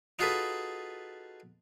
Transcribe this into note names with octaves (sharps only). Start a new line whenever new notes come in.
D#4 F4 F#4 G#4 A4 B4